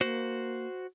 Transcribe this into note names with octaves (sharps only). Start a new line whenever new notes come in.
A#3 F#4 C5